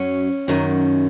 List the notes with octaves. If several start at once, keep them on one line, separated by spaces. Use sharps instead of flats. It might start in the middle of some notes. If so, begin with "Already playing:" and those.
Already playing: F#2 F#3 C#4
F#2 D#3 F#3